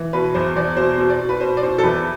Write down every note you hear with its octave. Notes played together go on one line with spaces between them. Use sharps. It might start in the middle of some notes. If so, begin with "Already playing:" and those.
Already playing: E3
B2 B4
E2 C5
E2 D5
B2 C5
B2
D5
B2
B4
B2 C5
D5
B2 C5
A4
E2 B4